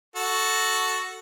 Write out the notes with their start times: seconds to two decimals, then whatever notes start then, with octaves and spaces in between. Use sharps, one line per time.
0.16 F#4 A4